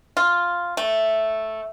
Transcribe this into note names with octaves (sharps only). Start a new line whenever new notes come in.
F4
A3